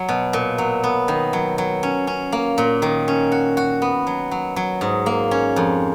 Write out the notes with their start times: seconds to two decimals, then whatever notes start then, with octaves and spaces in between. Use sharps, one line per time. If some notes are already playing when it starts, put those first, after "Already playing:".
Already playing: F#3
0.09 B2
0.33 A#2
0.58 F#3
0.84 B3
1.08 D#3
1.33 F#3
1.58 F#3
1.83 C#4
2.07 C#4
2.32 A#3
2.58 A#2
2.82 D#3
3.08 C#4
3.32 F#4
3.57 F#4
3.82 B3
4.07 F#3
4.31 F#3
4.56 F#3
4.81 G#2
5.06 A#3
5.31 C#4
5.56 F2